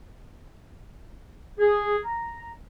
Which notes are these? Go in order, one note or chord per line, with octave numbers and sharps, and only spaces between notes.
G#4
A#5